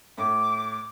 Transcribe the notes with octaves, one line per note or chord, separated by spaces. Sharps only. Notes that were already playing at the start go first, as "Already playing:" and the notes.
A2 D6